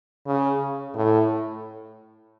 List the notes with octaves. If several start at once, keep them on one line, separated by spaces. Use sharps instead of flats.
C#3
A2